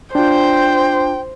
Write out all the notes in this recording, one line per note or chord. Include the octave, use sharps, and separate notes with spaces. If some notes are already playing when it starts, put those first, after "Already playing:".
D4 F4 C5 G5